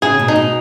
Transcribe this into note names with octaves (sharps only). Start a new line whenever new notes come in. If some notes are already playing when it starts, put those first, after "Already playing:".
C#3 G#4
B2
D#4
B2